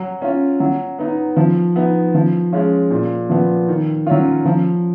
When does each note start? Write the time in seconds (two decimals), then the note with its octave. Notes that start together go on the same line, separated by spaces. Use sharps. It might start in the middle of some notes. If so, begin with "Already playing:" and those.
Already playing: F#3
0.22 C#4 F4
0.60 F#3
0.99 B3 D#4
1.37 F3
1.76 B3 D#4
2.14 F3
2.53 G#3 C#4 F4
2.91 A#2
3.29 F3 B3
3.68 D#3
4.07 F#3 C#4 F4
4.45 F3